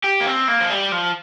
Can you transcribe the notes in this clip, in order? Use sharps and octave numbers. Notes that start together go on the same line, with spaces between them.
G4
A#3
C4
A#3
F3
G3
F3